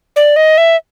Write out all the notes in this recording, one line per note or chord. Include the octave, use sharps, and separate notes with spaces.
D5
D#5
E5